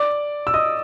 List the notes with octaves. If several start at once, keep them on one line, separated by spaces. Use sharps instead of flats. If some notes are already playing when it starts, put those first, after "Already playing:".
Already playing: D5 D6
E6
D#5 D#6